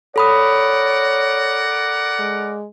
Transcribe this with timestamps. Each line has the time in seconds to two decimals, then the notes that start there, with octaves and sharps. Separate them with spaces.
0.16 A4 A#4 C#5 D5 F#5 B5 D#6
2.19 G#3